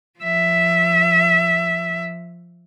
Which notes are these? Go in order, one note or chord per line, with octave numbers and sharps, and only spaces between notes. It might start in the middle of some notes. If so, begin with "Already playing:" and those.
F3 E5